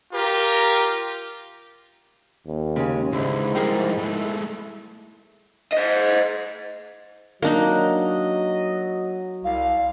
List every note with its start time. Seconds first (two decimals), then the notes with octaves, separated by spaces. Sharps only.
0.12 F4 G4 A#4
2.47 D#2
2.76 C#3 G#3 C#4
3.12 C#2 G#2 D3 E4
3.55 F3 G3 G#4 A#4 G5
3.98 G#3 A3
5.72 C5 D#5
7.42 F#3 A#3 D4 D#4 D#5
9.44 C2 F5